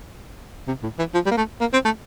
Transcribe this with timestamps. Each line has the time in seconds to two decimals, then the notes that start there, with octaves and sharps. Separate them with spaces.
0.67 C3
0.83 A2
0.98 E3
1.14 F3
1.26 G3
1.31 A#3
1.37 A3
1.60 A#3
1.73 C4
1.85 A3